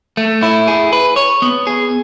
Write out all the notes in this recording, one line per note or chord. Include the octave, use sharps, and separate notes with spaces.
A3
E4
G#4
B4
C#5
B3
G#4